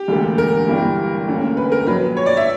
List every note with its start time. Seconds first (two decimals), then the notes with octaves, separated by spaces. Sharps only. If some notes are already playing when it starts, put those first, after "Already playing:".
Already playing: G4
0.08 E1 D2 D3 A#3
0.38 A#4
0.68 G1 G2 E3 G3
1.27 D2 D3 A#3 C#4
1.57 B4
1.72 A#4
1.87 A#1 A#2 F#3 B4
2.17 C#5
2.26 D5
2.37 E5